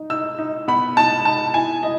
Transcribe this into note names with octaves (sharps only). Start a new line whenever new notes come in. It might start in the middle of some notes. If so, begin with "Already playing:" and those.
Already playing: D#4
D#4 E6
D#4
B3 B5
D#4 A5
D#4 A5
E4 G#5
E4 D#5